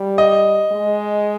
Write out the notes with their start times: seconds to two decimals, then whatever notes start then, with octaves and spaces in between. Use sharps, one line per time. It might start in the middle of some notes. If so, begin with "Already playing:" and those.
Already playing: G3
0.18 D#5
0.72 G#3